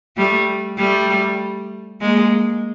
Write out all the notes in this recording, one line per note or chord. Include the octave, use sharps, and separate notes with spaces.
G3 A3
G3 A3
G#3 A#3